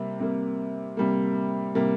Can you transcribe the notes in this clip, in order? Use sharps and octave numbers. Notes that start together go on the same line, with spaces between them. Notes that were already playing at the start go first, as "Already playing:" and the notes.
Already playing: C3 G3 A#3
C3 G3 A#3
C3 G3 A#3
C3 G3 A#3